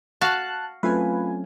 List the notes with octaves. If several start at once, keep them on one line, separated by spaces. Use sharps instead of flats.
F#4 F5 A5 F#6
F#3 A3 C4 C#4 F4 B4 G#5